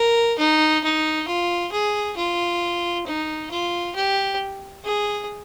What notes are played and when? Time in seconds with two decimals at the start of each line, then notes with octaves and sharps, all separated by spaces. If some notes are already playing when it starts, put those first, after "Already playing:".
Already playing: A#4
0.38 D#4
0.83 D#4
1.28 F4
1.72 G#4
2.16 F4
3.06 D#4
3.50 F4
3.95 G4
4.84 G#4